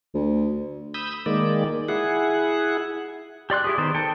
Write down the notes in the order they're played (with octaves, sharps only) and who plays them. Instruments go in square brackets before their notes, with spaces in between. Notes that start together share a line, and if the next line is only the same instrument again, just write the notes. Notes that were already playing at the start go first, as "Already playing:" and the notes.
[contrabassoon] D2
[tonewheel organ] B5 D#6 E6 G6
D#3 G#3 A#3 D5
E4 G#4 F#5
[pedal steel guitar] G4 D5 C6 F#6
E4 G4 G#4
D#3 B3 C5
A4 G5